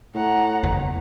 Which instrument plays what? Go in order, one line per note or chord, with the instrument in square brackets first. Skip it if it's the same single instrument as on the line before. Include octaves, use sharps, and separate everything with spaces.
[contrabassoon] A2 [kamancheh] F#5 A#5
[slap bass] F#1 E2 E3